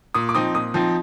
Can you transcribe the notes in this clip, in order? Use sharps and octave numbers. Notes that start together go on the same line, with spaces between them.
A#2 D#6
D6
F3 C4 D#4 D#6
A#2 D#6
F3 C4 D#4